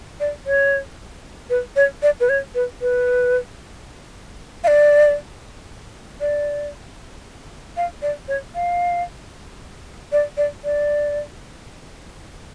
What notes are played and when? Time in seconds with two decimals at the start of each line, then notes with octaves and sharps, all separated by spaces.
0.20 D5
0.46 C#5
1.50 B4
1.76 C#5
2.03 D5
2.20 B4
2.29 C#5
2.55 B4
2.82 B4
4.64 F5
4.68 D5
6.21 D5
7.77 F5
8.02 D5
8.28 C#5
8.55 F5
10.12 D5
10.37 D5
10.64 D5